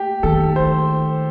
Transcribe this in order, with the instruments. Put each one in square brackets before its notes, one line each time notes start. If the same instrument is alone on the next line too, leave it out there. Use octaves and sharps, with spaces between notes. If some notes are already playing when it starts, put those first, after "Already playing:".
Already playing: [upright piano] G4
[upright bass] D#3 [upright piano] A4
[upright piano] C5